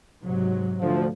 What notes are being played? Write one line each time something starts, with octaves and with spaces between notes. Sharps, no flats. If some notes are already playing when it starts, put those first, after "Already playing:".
G#2 C3 F#3
D2 F3